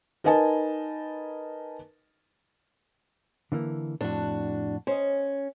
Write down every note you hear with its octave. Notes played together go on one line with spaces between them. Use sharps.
D#4 A#4 B4 D#5 G#5 A5
D3 E3 A#3
F2 A2 D4 F#4
C#4 C5 D#5